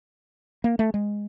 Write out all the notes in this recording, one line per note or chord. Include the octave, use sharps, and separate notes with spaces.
A#3
A3
G#3